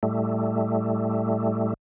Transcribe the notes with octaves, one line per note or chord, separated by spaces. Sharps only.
A2 G3 A3